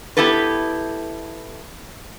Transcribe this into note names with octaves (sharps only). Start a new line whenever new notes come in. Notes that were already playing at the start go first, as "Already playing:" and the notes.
B3 E4 G4 A4 B4